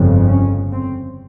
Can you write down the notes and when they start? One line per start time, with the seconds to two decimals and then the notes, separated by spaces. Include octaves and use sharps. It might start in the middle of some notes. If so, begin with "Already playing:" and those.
Already playing: G1 F2 C#3
0.28 C#4
0.72 C4